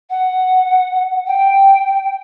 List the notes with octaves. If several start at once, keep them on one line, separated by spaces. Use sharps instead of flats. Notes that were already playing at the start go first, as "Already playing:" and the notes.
F#5
G5